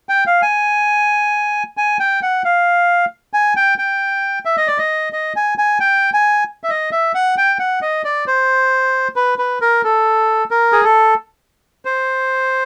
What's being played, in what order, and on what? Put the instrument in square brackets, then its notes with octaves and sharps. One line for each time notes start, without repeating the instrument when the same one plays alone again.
[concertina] G5
F5
G#5
G#5
G5
F#5
F5
G#5
G5
G5
E5
D#5
D5
D#5
D#5
G#5
G#5
G5
G#5
E5
D#5
E5
F#5
G5
F#5
D#5
D5
C5
B4
B4
A#4
A4
A#4
G#4
A4
C5